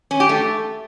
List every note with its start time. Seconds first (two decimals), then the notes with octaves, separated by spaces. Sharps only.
0.11 C#4
0.20 G4
0.29 A3